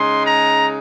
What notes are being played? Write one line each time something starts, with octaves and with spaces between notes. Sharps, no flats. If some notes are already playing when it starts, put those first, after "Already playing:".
Already playing: C#3 G#3 D#4 C6
A#5